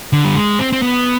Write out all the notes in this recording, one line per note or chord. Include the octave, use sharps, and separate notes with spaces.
D3
G3
G#3
C4
C4
B3